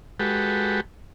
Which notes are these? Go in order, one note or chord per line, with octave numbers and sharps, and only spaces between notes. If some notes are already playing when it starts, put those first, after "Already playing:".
G#3 F#4 G4 A4 B4